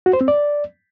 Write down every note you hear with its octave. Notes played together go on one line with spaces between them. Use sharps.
F#4
C5
C4
D5